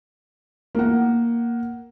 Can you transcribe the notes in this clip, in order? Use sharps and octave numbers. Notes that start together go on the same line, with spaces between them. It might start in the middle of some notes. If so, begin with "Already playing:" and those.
A#3 F#5